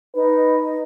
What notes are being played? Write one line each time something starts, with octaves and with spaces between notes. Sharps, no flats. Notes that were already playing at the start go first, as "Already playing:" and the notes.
D#4 B4